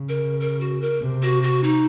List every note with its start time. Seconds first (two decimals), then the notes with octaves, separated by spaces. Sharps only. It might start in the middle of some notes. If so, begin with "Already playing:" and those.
Already playing: C#3
0.08 A#4
0.40 A#4
0.60 F#4
0.81 A#4
1.02 C3
1.22 F#4
1.43 F#4
1.63 D#4